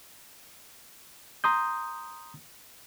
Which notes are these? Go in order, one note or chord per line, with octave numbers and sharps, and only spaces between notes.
A#5 C6 D#6 G6